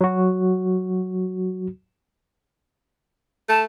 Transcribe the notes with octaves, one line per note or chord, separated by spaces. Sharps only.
F#3 F#4
A3 A5